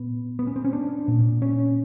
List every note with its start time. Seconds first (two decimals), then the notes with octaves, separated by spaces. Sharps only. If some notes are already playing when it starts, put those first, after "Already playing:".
Already playing: A#2 B3
0.39 B3
0.47 C#4
0.56 C4
0.65 C#4
0.73 D4
1.08 A#2
1.42 C#4